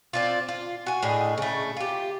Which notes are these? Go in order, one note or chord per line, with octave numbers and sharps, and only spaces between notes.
C4 D4 F4
F4
F#4 G#5
A2 D4 G#4 D#5
C#3 A3
F4 G4